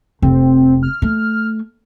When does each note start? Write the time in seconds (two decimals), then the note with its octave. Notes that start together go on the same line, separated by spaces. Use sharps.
0.22 F1 C4
0.83 F6
1.02 A3